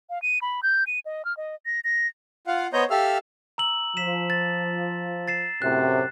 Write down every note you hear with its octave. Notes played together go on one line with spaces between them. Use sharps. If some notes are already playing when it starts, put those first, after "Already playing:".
F5
D#7
B5
G6
D#7
D#5
F6
D#5
A#6
A#6
F4 F5 F#5
B3 C5 C#5 D#5 A#5 G6
G4 A4 E5 F5 E6 F6
A#5 E6 F#7
F3 B6 E7
A6
A6 C7 E7
F#2 A2 C3 F#6